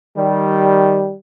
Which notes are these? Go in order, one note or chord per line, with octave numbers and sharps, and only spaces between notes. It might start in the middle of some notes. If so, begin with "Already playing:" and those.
D#3 G3